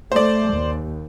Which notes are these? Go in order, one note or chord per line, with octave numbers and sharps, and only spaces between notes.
A3 C5 D5
D#2